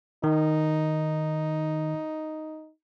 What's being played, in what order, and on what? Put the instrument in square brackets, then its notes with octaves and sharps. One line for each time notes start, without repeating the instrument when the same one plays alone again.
[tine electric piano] D#3 [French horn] D#4